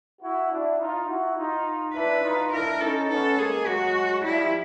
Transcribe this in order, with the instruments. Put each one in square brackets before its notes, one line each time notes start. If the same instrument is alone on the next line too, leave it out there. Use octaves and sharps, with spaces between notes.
[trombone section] E4 F#4
D4 E4
D#4 F4
E4 F#4
D#4 F4
[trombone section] D4 E4 [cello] B4
[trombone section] D#4 F4
[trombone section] D4 E4 [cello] A#4
[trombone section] C#4 D#4 [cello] A4
[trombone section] B3 C#4 [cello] A4
[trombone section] G#3 A#3 [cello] G#4
[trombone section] F#3 G#3 [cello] F#4
[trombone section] F3 G3 [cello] E4